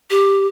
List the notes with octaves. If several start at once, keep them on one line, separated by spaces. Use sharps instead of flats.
G4